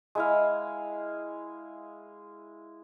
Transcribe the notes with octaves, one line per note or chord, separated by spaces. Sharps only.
G#3 E4 F5